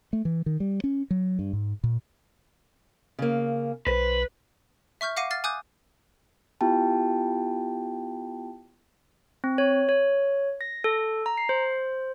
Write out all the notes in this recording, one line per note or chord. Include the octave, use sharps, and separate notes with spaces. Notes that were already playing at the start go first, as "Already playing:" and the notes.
A3
E3
D#3
G3
C#4
F#3
G2
G#2
A#2
C#3 A#3
B1 B4 C5
E5 C#6 F6 G6
F5 F#5 D6 A#6 C7 D#7
F6 A6 C7
G#5 D6 D#6 F#6 G6
B3 E4 F4 G4 G5 A5
C4
C#5
C#5
A#6
A4
A#5
C7
C5